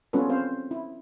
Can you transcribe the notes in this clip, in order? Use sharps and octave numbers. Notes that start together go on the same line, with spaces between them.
G3 B3 C#4 F4 A4 B4
C4 C5 F5
E4